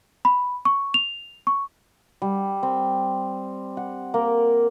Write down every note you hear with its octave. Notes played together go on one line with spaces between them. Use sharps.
B5
C#6
F7
C#6
G3
C4
F#5
A#3